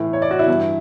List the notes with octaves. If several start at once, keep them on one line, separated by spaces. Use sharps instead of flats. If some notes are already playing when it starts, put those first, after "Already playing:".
Already playing: A2 E3
C#5
D5
F#4
E4
G2 E3